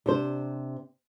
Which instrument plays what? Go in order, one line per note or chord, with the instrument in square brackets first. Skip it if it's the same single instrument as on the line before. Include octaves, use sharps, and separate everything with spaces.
[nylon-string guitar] C3 D4 C5